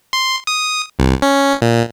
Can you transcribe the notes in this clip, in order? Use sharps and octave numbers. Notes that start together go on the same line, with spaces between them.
C6
D#6
C2
C#4
A#2